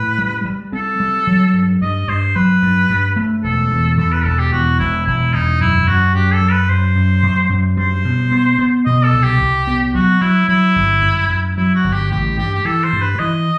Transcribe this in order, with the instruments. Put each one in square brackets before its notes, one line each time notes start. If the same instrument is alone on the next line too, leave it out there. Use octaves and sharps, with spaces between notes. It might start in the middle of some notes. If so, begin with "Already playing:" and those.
Already playing: [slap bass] A2 [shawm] B4
[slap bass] G3
G3
[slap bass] C4 [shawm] A4
[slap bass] G3
F#3
G2
[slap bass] G2 [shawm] D#5
[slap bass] G2 [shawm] C5
[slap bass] F#3 [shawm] B4
[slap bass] G2
G2
A3
[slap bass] E1 [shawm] A4
[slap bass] E2
[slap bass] E2 [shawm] A4
[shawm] B4
[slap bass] E1 [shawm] A4
[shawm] G4
[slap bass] E2 [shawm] F#4
[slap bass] E1 [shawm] E4
[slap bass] E1 [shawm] E4
[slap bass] E1 [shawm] D#4
[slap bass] F#2 [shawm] E4
[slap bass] F#2 [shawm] F#4
[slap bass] F#2 [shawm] G4
[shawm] A4
[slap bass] F#3
[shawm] B4
[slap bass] F#2 [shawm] C5
[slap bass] F#2
F#2
F#2
[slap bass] G3 [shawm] C5
[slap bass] B2
B3
B3
[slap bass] B2 [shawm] D#5
[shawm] A4
[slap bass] C2
[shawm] G4
[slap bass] C2
B3
[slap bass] F#3 [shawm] F#4
[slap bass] F#3 [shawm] E4
[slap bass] F#3 [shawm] E4
[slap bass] G1
F#2
F#2
[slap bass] F#3 [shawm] E4
[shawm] F#4
[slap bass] G1
[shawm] G4
[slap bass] A1 [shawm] G4
[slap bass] G2 [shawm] G4
[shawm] G4
[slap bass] E3 [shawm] A4
[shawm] C5
[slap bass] G2
[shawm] B4
[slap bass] E3 [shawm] D#5